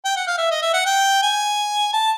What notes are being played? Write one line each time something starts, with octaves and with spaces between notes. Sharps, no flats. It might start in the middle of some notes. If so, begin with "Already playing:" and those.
G5
F#5
F5
E5
D#5
E5
F#5
G5
G#5
A5